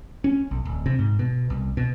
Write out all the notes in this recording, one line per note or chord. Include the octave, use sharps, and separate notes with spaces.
C#4
B1
D1
C3
G#2
B2
C2
B2